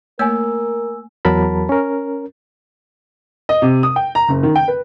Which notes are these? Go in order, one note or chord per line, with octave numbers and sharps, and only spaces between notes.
A3 A#3 A#4 C#5 G#5 E6
E2 F#3 A#4 A5 B5
C#4 A#4
D#5
C3
D#6
G5
A#5
F#1
D#3
G5
B4